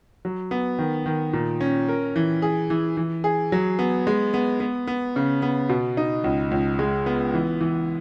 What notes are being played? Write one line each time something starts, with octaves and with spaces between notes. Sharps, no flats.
F#3
B3
D#3
D#3
A#2
C#4
A#4
E3
G#4
E3
E3
G#4
F#3
B3
G#3
B3
B3
B3
C#3
B3
B2
D#4
C#2
C#2
G#3
B3
E3
E3